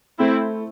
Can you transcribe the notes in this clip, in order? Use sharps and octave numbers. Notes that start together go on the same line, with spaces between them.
A3 C4 E4